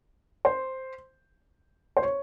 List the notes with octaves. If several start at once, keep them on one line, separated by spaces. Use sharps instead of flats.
C5
C5
C#5